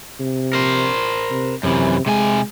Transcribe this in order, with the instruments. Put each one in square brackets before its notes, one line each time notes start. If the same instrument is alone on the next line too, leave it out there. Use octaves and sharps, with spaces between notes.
[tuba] C3
[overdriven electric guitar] A#4 C5
[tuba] C3
[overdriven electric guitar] F#2 E3 [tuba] C3
[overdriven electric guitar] C3 G#5 [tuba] G#3